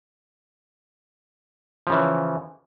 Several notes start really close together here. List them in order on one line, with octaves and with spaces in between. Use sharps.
F3 C#3 E3